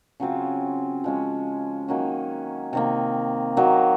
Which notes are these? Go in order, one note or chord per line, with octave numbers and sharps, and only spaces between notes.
C#3 F#3 C4 F4
F3 G#3 C#4
D#3 F#3 A#3 C#4
C3 D#3 A#3
D#3 F#3 A#3